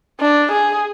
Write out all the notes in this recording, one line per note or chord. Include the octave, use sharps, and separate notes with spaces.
D4
G#4